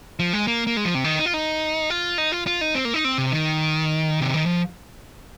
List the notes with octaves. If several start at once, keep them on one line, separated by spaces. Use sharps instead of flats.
F3
G#3
A#3
A#3
G#3
F3
C3
D#3
D#4
F4
D#4
F4
D#4
F4
F4
D#4
C4
A#3
D#4
C4
C3
D#3
C3
D#3
F3